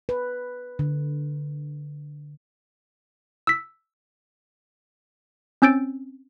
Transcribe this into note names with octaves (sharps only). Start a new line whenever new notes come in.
B4
D3
E6 B6
C4 C#4 E6 G6 A6 D7